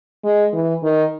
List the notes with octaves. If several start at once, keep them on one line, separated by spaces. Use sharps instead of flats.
G#3
E3
D#3